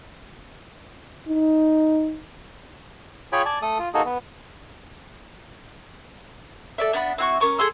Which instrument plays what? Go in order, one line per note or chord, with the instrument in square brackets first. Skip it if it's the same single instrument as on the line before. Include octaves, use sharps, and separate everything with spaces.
[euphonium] D#4
[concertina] F4 G#4 C#5 G5 G#5 B5
D5 G#5 A5
A3 A4 D#6
F4
A#3 D#4 F#4 G#4 A4
B3
[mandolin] A4 D5 E5
B3 D4 F#5 B5
C4 E4 F#4 C#6
C#4 A#4 C#6 D6
G#4 A4 C6 E6